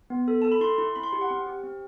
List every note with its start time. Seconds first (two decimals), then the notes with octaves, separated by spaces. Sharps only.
0.10 B3
0.28 A4
0.42 A4 A5
0.52 B5
0.61 E4 C6
0.78 E4
0.96 C4 B5
1.03 C6
1.13 G4
1.21 F#5
1.30 C4
1.46 G4
1.64 C4